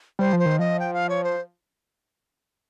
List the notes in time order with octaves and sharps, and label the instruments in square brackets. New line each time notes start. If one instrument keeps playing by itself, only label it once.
[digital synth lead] G3 [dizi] C5
[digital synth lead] F3
[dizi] C5
[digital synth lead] D#3
[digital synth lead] F3 [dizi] D#5
[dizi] G5
F5
C#5
C5